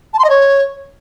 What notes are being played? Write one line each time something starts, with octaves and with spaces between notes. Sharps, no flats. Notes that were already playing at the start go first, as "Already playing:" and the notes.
A5
C6
D#5
C#5